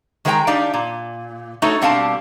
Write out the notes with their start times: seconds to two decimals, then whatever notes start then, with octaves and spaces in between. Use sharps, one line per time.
0.25 D#3 G#3 A#4 B4 G5 A#5
0.47 D4 D#4 G4 D5 F5
0.74 A#2
1.62 A3 D#4 F#4 A4 C#5
1.82 B2 G3 C4 D4 F5 A5